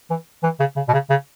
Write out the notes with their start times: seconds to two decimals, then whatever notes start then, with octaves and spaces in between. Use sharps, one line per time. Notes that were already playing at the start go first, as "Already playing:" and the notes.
0.10 E3
0.43 E3
0.60 C#3
0.77 C#3
0.88 B2
0.93 C#3
1.10 C#3